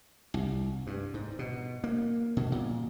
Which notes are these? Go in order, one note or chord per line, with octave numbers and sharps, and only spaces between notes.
C2
G2
G#2
B2
A#3
B2
A#2